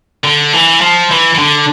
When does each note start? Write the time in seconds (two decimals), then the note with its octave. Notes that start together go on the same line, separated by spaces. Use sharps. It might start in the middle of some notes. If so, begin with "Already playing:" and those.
0.24 D3
0.53 E3
0.81 F3
1.11 E3
1.35 E3
1.39 D3